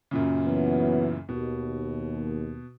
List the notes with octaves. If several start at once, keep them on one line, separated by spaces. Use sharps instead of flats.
F#2 A#2 C#3
E3 F#3 B3
D#2 B2